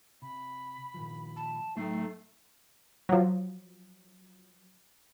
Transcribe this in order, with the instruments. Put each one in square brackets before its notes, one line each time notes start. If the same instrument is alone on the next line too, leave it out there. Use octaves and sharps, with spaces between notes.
[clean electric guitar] C3 [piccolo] B5
[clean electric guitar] A#2 D#3 F3
[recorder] A5
[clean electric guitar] A2 F#3 G5 [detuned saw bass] A3 [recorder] D#4 [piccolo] C7
[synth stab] F3 F#3